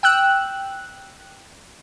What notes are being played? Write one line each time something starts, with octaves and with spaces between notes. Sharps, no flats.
G5 E6 F#6